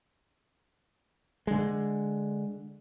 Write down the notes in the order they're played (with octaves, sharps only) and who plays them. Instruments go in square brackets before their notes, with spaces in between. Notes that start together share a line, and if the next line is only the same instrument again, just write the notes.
[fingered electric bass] D3 G#3